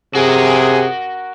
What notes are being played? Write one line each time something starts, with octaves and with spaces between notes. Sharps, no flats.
C3 F#4 G#4 A#4